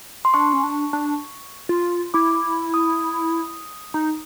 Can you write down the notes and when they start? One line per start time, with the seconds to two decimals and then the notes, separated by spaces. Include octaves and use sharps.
0.25 C6
0.34 D4 C#6
0.53 C#4
0.64 D4
0.93 D4
1.69 F4
2.14 E4 D6
2.74 D#6
3.94 D#4